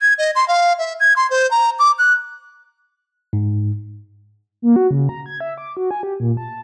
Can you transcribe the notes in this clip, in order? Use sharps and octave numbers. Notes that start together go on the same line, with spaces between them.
G#6
D#5
C6
F5
E5
G#6
C6
C5
A#5
D6
F#6
G#2
A#3
F#4
C#3
A#5
G#6
E5
D6
F#4
G#5
G4
A#2
A5